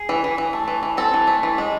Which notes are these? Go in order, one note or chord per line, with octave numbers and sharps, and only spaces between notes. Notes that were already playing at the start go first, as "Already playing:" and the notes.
Already playing: G#4
E3
E3
E3
A3
E3
E3
C4 A4
E3
A3
E3
G#3